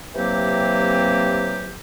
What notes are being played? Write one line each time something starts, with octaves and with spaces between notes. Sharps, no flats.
C3 E3 F#3 A#3 C4 G4